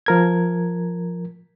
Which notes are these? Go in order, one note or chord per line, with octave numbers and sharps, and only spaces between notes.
F3 A#4 G#6